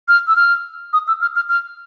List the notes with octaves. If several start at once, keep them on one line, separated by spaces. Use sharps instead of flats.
F6
E6
F6
D#6
E6
F6
F6
F6